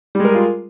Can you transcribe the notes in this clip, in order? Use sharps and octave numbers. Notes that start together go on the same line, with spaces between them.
G3 G#3 F4 G#4 A#4